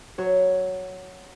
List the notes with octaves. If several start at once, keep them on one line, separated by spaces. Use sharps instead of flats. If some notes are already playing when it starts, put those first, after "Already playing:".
F#3 C#5